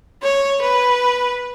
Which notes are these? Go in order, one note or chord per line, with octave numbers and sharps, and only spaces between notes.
C#5
B4